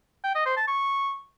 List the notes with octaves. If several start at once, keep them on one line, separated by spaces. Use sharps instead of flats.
G5
D#5
C5
A5
C#6